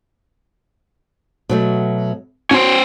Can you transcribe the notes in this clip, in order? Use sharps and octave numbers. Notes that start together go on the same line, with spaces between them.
B2 F#3 A3
C#4 F#4 C5